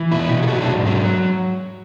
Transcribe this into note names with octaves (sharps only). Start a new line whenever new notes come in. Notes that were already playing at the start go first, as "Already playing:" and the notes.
Already playing: E3
B2 E4
B2 F#4
G#4
F#3 F#4
D4
G#2
F#3